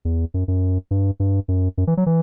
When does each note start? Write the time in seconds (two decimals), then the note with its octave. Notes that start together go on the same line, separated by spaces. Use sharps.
0.05 E2
0.34 F#2
0.48 F#2
0.91 G2
1.20 G2
1.48 F#2
1.78 F#2
1.87 E3
1.97 F#3
2.06 E3